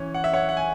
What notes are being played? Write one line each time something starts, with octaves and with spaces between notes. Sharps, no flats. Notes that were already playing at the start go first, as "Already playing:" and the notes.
Already playing: E3 C#4
F#5
E5
C#5 F#5
F#5
G#5